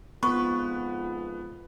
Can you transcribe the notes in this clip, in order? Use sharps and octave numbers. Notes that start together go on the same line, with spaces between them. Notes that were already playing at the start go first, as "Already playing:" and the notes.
F2 G#2 B3 F4 B4 C#6